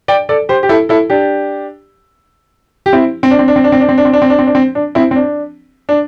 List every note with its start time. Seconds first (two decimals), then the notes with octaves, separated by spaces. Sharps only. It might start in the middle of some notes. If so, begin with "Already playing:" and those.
0.08 D5 G5
0.29 A4 D5
0.49 G4 C5
0.63 G4
0.69 E4 A4
0.89 E4 A4
1.10 D4 G4
2.86 G4
2.93 C4 E4
3.23 C4
3.31 D4
3.39 C4
3.48 D4
3.56 C4
3.64 D4
3.72 C4
3.81 D4
3.89 C4
3.98 D4
4.05 C4
4.13 D4
4.22 C4
4.30 D4
4.39 C4
4.47 D4
4.55 C4
4.75 D4
4.95 C4 E4
5.11 C4
5.16 D4
5.89 D4